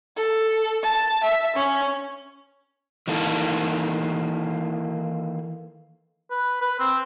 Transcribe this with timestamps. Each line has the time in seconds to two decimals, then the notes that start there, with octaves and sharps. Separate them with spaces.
0.16 A4
0.83 A5
1.23 E5
1.55 C#4
3.07 D#3 E3 A#3 A4
6.31 B4
6.61 B4
6.79 C4